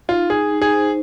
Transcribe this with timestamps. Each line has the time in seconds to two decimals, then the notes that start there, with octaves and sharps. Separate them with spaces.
0.08 D#4 F4
0.30 D#4 G#4
0.51 D#4
0.62 G#4
0.71 C5